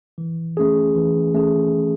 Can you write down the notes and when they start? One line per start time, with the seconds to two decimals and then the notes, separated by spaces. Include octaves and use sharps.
0.18 E3
0.57 A3 C#4 G#4
0.95 E3
1.35 A3 C#4 G#4